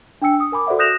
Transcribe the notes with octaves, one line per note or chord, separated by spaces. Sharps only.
D4 G5 G#5 E6 C#7
D#6
A#4 G#5 B5 D6
F#4 A4 C5 D5 E5 F#5
D#6 F#6 G6 A#6 E7 F7